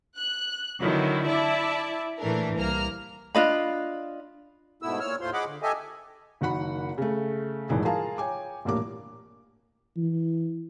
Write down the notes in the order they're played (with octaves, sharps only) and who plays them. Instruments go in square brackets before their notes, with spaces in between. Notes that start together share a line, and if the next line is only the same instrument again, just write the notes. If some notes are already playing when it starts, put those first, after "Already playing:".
[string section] F#6
D3 D#3 F#3 B3 E4
E4 D5 E5 A5
A#2 E3 A3 D4 A#4
C2 A#3 A#5 F6
[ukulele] D4 F4 D#5 B5
[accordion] G#2 B2 A3 B3 E4 E6
A#2 C#5 E6 F6
D#2 A2 A3 F4 C5 C6
G#4 D#5 F#5 B5 D6
D3
G4 A4 D#5 E5 G#5
[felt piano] F#1 D#3 F#4 F#5 B5
C#3 A3
D#1 G#1 D#3 E3 G#4
F4 G#4 A#4 F5 A5 A#5
C#5 G5 G#5 D6
D#1 A1 G3 A#3 D4 D6
[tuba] E3